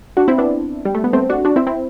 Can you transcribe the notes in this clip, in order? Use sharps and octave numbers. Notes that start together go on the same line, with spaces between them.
D4 F#4
C4 E4
B3 D4
G3
A3
B3
A3 C4
D4 F#4
D4 F#4
C4 E4
C4 E4